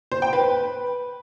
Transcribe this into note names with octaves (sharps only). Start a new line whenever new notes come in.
C5
G5
B4